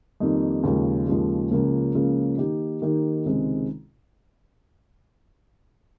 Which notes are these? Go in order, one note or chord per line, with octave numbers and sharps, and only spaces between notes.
F2 D#3 G3 A#3 D#4
D#2 C#3 F3 G#3
D#2 C#3 F3 G#3
C#2 C#3 F3 A#3
C#2 C#3 F3 A#3
D#3 A#3 D#4 G4
D#3 A#3 D#4 G4
C#2 C3 D#3 G#3 C4